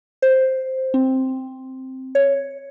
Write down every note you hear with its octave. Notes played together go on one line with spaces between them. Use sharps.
C5
C4
C#5